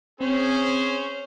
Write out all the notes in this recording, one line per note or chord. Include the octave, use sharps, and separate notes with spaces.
C4 C#4 G#4 C5